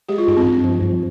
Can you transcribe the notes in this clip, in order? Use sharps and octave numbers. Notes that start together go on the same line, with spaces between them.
G#3 G4
F4
G2 D#4
C4
G2
F3
F3